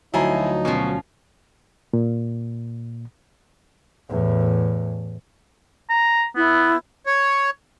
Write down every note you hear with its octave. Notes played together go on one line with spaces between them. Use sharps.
D2 F3 F#3 D#4 E4 G#5 A#5
B2 F3 C#4
A#2
E2 A2
A#5
B3 E4
C#5